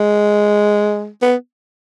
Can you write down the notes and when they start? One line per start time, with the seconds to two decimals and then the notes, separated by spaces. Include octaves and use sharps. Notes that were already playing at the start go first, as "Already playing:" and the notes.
Already playing: G#3
1.22 B3